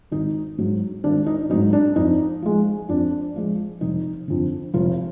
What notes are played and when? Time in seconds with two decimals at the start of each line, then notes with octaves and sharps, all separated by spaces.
0.11 G#1 D#4
0.58 G#2 F#3
1.04 G#1 D4
1.26 D#4
1.50 F#3 D#4
1.53 G#2
1.73 D4
1.96 F2 D#4
2.42 F3 G#3
2.89 F2 D4
3.36 F3 G#3
3.81 F1 D#4
4.28 F2 D3
4.74 F1 F4